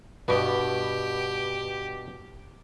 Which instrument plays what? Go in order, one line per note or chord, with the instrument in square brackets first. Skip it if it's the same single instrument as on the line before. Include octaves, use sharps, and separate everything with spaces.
[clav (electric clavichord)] G2 B2 B3 [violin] G4